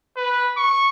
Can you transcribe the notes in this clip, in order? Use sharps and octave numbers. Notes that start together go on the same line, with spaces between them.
B4
C#6